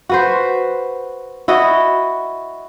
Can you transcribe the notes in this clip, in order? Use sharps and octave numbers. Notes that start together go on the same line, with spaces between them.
F#4 B4 C5
E4 F#4 D#5